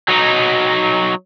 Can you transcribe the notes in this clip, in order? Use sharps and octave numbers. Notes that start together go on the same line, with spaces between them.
F#3 D#4